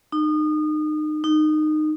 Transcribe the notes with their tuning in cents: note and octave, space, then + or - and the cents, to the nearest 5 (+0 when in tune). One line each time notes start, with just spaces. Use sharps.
D#4 -30
D#4 -20